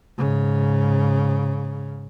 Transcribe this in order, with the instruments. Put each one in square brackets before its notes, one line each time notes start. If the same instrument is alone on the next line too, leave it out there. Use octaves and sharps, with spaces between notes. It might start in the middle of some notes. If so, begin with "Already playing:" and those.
[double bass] G#2 C#3